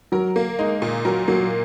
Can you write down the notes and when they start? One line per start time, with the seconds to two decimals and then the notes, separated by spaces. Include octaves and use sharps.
0.12 F#3 A#4
0.36 A#3
0.59 G#3 D#4
0.82 A#2
1.05 F#3 A#4
1.28 F#3 A#3